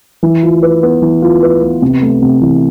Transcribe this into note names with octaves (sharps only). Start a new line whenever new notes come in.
E3
F4
B4
B3
E3
F4
B4
B3
C3
A3
C3
E3